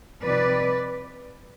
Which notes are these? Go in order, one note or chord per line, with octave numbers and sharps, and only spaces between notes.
C3 F3 C4 D#4 B4 D5